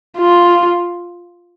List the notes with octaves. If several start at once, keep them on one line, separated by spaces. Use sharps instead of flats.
F4